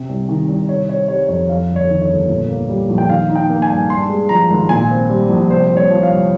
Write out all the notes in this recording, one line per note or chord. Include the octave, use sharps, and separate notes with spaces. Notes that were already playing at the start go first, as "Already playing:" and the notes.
Already playing: C3
C2
D#3
C2
C3 C#5
C4 C#5
G3 C#5
F2 C#5
F2 F5
G1
C#5
D#3
C#5
G1
A#2
A#3
G3
A#1
G5
D#3 F5
D#4
G5
A#3
G#5
G2
G2 C6
G#3
F3 A#5
G#1
A#2 G#5
C4
G3
A#1
C3 C5
C2
C#5
F3
F5
C2